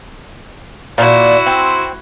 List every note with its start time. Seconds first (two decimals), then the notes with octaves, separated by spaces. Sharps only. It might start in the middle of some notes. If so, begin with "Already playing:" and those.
0.98 A#2 E4 F#4
1.46 C4